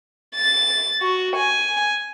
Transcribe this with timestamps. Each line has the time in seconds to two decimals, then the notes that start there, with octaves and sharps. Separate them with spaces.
0.35 A6
1.01 F#4
1.36 G#5